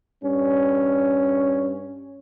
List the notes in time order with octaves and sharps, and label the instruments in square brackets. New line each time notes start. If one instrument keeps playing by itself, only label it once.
[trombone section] G2 C#4